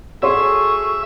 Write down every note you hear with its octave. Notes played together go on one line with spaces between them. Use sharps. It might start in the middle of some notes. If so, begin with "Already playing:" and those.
F#4 G#4 A4 C#5 E5 C6 C#6